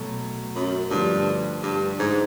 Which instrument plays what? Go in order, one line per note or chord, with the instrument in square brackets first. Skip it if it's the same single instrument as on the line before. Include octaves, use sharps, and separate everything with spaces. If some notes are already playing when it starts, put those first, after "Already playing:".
Already playing: [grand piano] B2 F#3 A3
[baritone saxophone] F#2
[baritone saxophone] G2 [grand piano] D3 F3 A3
[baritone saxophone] G2
G#2